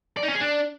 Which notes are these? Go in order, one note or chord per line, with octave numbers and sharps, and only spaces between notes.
D5
D#4
C#4
G#4
D4